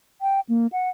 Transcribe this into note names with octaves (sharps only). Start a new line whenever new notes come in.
G5
A#3
F#5